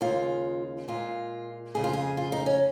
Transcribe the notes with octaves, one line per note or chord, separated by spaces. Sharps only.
D#2 C#3 G#3 F4
A#2 G#3 F4
F2 C#3 G#3 G#4
F4
G#4
F4
D#4
C#4